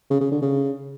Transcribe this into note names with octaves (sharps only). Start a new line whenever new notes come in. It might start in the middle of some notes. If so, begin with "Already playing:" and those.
C#3
C#3
D3
C#3